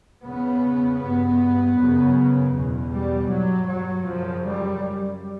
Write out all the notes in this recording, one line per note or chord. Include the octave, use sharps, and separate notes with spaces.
E2 C#3 B3
G2 B3
F#2 C#3
E2 B2
G3
G2 F#3
F#3
F#2 C#3 F3
G3